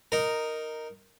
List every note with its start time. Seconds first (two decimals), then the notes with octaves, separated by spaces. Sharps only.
0.12 D#4 A#4